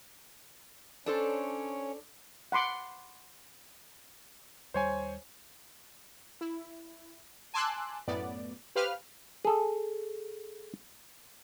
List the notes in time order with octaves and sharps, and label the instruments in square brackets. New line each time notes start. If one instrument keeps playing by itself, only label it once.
[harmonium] C#4 C#5 [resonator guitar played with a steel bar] D4 A4 C5
[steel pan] F#5 B5 C6 D6
[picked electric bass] D#2 G3 [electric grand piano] C5 C#5 G#5
[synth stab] E4
G#5 A5 C6 D6 E6 F#6
F#2 A2 B3 D5
G4 B4 C5 F5 F6
[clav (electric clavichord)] G#4 A4